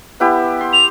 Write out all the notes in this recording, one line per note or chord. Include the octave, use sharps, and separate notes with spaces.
B3 E4 G4
C6
F7